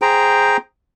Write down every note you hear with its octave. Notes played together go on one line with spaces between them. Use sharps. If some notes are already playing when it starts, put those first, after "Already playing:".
G#4 C5 G5 A#5